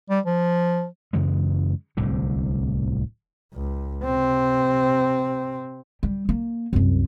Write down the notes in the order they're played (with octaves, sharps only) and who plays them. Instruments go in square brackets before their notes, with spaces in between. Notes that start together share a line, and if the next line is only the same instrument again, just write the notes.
[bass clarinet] G3
F3
[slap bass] F#2 C#3 E3 G#3
D1 C2 A2 D3
[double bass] C#2
C3 C4
[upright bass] G3
A#3
C2 F#2